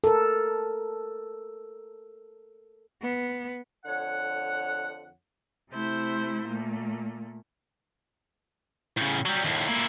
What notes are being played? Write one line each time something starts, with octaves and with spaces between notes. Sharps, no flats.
A4 A#4
B3
F2 D3 C#5 F#5
C3 A3 E4 C5 G6
A#2 A3 A#3
A2 C#3
F#3 G3
D#2 A2
A#2 E4